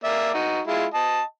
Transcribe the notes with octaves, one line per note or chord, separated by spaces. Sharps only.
A#3 D5 E5
D#4 F#4
G#3 E4 F4
D#5 A5